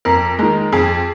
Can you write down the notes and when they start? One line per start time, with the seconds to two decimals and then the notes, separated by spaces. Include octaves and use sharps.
0.05 F2 A#4
0.39 D#3 G#3
0.72 F2 G#4